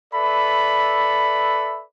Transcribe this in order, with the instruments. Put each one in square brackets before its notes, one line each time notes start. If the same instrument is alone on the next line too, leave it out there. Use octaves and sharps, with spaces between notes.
[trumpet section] A4 B4 D5 E5 B5